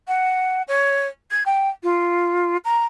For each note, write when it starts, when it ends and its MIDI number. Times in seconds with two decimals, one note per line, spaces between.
0.08 0.62 78
0.67 1.07 73
1.31 1.43 92
1.46 1.69 79
1.83 2.57 65
2.64 2.85 82